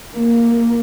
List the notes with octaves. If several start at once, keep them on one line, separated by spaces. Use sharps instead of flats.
A#3